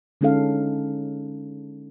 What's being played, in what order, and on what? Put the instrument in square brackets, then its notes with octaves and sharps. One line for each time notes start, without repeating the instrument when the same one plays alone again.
[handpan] D3 G#3 C#4 D#4 A4 F5